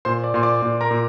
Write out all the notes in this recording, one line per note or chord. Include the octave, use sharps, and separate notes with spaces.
A#2 C5 C6
D5 D6
A#2 C6
D5 D6
A#2
A#4 A#5
A#2